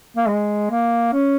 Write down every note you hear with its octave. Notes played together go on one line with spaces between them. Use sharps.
A#3
G#3
A#3
C#4